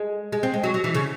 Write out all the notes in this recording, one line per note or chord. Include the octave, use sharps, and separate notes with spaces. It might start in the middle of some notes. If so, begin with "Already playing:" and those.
Already playing: G#3
G#3
C4
G#3
F#3
F#3
E3
C#3